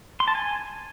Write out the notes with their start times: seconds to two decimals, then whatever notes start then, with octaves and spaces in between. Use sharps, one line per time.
0.20 C6
0.28 A5
0.35 G#5